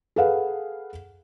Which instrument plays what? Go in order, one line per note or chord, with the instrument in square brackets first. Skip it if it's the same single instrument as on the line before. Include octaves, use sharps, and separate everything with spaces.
[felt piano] G#4 A4 B4 F5 F#5